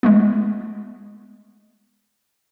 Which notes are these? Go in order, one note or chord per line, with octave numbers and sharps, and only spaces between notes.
G#3 A3 B3